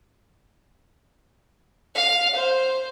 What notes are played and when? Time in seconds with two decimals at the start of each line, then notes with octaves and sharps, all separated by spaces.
1.95 F5
2.35 C5